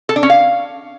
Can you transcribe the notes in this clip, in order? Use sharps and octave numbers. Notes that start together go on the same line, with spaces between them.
A4
D4
C#4
F5